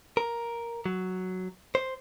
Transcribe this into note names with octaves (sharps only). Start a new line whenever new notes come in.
A#4
F#3
C5